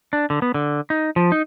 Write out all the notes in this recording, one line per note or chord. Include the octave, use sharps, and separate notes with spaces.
D4
D3
B3
D3
D#4
F3
D#4